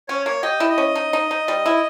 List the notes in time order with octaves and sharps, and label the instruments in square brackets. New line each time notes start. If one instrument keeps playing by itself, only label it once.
[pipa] C#4 [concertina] C#5
[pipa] A#3 [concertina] C#5
[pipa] G4 [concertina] D#5
[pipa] E4
[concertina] D#5
[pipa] C#4
D#4
D#4
D#4
G3
E4